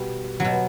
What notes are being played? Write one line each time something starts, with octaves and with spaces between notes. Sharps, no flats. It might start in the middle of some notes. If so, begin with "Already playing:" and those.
Already playing: B2 G3
B2 F#3